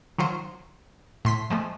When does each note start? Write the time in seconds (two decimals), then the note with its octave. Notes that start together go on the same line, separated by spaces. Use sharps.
0.18 D#3 F#3 F4 C5
1.25 A2 C6 B6
1.50 F3 G#3 A3